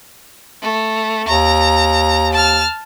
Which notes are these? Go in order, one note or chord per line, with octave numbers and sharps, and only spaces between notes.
A3
D#2 A#5
A5 F6